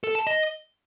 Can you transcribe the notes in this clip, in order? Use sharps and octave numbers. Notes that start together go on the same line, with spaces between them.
A4
A5
D#5